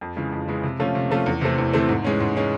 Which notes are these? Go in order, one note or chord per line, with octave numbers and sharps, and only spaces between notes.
F2
C#3 E3 G#3
F2
C#3 E3 G#3
C3
F3 A3 C#4 F4
C3
F3 A3 C#4 F4
E2
C3 E3 A3 C4
E2
C3 E3 A3 C4
G#2
E3 G#3 C#4
G#2
E3 G#3 C#4